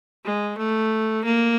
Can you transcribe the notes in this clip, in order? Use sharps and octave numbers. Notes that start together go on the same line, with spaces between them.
G#3
A3
A#3